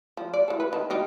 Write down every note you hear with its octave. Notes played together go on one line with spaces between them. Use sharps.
F3
D5
E3 A4
B4
D#3 A5
B3 D#4 G4